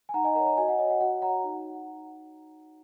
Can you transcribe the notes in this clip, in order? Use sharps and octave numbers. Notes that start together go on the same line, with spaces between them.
G#5
D#4 F#5 A#5
D#5 G#5
A#4 C#5 F#5 A#5
F#5 A#5
F#4 D#5 G#5
F#5
C#5 D#5
F#5
F#4 F#5
C#5 F#5 A#5
D#4